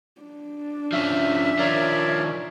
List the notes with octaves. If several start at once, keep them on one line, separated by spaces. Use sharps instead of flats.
D4
F3 C#4 E5
D#3 F3 A#4 C#5 D5